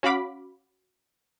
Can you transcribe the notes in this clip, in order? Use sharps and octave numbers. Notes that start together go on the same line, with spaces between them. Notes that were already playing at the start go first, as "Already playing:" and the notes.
C#4 F#4 F5 B5 D6 B6